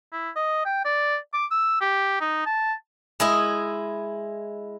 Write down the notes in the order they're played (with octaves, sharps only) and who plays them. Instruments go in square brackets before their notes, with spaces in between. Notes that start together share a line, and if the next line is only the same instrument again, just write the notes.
[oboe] E4
D#5
G5
D5
D6
E6
G4
D#4
A5
[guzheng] G#3 E4 D#5